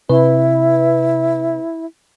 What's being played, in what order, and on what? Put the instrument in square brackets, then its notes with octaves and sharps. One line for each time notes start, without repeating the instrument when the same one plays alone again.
[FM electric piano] C3 B4 [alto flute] E4